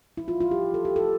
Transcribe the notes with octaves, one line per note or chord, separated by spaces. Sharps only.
E4
F4
F4
G4
A4
G4
A4